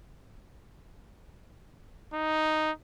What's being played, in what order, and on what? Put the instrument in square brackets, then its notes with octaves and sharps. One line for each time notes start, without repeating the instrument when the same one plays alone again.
[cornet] D#4